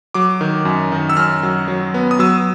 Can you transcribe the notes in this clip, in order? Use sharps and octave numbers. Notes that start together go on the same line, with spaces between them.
F#3 D6
D#3
F#2
D#3
E6
F#2 F6
F#3
F#3
B3
D#6
F#3 E6